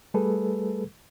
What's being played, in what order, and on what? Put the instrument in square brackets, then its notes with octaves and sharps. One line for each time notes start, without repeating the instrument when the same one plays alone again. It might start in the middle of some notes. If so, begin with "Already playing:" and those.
[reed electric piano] G3 A3 G#4 A4 B4